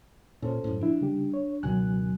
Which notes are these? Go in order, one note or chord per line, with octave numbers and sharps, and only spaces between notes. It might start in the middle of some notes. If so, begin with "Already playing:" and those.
A#2 C#4 A4 C5
F#2 A2
F3 D4 E4
C#3 G3 G4
C#5
C#2 B2 D#3 F#3 G#5 F#6